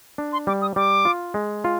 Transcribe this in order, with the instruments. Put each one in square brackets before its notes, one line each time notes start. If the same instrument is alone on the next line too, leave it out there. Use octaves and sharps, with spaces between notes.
[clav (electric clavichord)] D4
[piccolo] C6
[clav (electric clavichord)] G3 [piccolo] D6
[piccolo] D#6
[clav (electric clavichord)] G3 [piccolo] D6
[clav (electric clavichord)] F4
G#3
F4